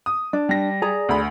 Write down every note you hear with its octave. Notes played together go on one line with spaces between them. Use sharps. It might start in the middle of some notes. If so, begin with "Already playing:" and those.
D#6
D4
G3 A#6
G#4 D5 A#5
D2 B5